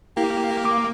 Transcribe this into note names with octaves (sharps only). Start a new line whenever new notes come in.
A#3 E4 G4
D6